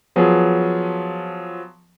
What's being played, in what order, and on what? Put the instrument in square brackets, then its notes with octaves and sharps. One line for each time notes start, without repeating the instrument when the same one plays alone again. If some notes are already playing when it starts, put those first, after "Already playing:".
[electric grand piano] F3 F#3 B3 G#4